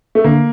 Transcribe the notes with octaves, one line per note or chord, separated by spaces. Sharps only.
A3
D3 A#3